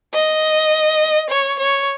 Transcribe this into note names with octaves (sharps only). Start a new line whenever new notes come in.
D#5
C#5
C#5